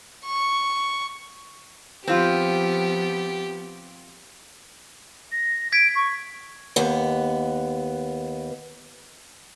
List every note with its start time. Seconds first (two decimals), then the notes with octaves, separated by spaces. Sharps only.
0.25 C#6
2.07 F3 B3 C4 F4 G4
5.32 A#6
5.72 G#6 B6 D7
5.96 C#6
6.76 D#2 B3